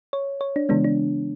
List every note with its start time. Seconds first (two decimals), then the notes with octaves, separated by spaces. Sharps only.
0.13 C#5
0.41 C#5
0.56 D4
0.69 C#3 E3 G#3 B3 D4
0.84 D4